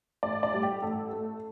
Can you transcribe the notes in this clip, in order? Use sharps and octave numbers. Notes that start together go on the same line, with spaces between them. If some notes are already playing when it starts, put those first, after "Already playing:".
A1 D5
D5
A2 G3
G4
A1 A4
A2 A3